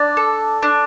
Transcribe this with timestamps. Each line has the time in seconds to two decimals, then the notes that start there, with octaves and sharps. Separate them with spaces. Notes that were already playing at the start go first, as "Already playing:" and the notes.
Already playing: D4 D5
0.17 A4
0.63 D4